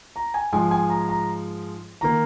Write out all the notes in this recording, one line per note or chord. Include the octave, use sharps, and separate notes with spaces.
A#5
G#5
G#2 F3 G#3 G#5
G#5
A#5
A#5
D#3 A#3 A#5